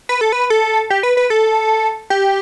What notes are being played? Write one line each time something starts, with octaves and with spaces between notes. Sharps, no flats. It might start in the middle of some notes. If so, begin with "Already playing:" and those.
B4
A4
B4
A4
G4
B4
B4
A4
G4